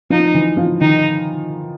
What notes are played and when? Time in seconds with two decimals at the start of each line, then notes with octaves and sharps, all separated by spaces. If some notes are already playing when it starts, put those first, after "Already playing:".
0.10 F3 D#4
0.35 E3
0.57 F3
0.81 D#3 D#4